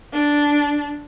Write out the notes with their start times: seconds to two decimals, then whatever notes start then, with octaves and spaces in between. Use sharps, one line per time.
0.13 D4